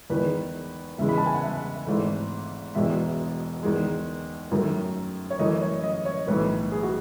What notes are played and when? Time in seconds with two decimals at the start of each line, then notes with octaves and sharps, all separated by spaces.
0.10 E2 D#3 G#3 B4
0.98 E2 C#3 E3 G#3 E5
1.09 B5
1.18 A5
1.26 G#5
1.35 F#5
1.42 E5
1.86 G#1 G#2 E3 A3
2.75 E1 E2 B2 G#3 E5
3.63 E2 D#3 G#3
4.51 F#2 D#3 F#3 A3
5.30 C#5
5.39 F#2 E3 A3 D#5
5.61 C#5
5.83 D#5
6.05 C#5
6.27 B1 A2 E3 A3 B4
6.72 G#4
6.83 F#4